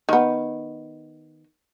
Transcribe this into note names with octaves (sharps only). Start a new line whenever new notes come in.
D#3 B3